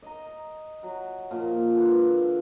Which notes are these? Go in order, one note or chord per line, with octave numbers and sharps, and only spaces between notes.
D#5 A#5
F#3
A#2 F3
D3 E3